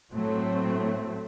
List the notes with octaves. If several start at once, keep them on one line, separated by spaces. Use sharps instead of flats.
A2 F#3 A3 C4